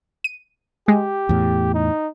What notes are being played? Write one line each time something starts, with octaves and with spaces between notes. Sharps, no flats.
D#7
G#3 G4
E2 A2
D#4